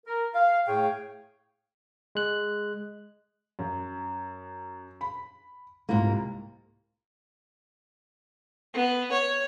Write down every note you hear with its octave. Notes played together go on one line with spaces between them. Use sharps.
A#4
F5
A2 A3 G#4 C#5 F5 G5
G#3 F#6
F#2
B5
C2 G#2 A#3 F4
B3
C#5